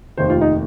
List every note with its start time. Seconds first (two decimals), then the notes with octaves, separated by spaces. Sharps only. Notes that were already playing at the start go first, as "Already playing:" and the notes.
0.17 F1 D#2 D#3 C5
0.30 F4
0.41 D#4